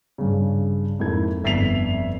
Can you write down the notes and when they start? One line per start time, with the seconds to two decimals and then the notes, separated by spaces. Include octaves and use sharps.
0.18 G2 C#3
0.99 F2 G#2 A#3 E4 A4 G#6
1.43 G1 F2 E5 B6 C7 F7